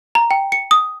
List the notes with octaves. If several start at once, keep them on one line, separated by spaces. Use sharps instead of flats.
A#5
G5
C#7
D#6